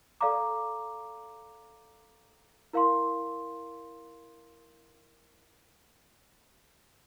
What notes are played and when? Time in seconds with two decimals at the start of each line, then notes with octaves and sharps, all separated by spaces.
0.21 A4 D5 F5 A#5 D6
2.73 E4 A#4 F5 C6